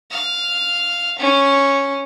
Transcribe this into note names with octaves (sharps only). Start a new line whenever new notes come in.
F5
C#4